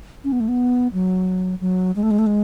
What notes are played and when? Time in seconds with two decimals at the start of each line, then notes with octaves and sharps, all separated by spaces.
0.24 C#4
0.32 B3
0.40 A3
0.48 B3
0.93 F#3
1.61 F#3
1.96 G#3
2.03 A3
2.11 G#3
2.19 A3
2.26 G#3